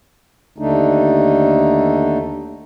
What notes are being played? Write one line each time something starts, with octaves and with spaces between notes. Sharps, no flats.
D#2 D3 A3 D4 D#4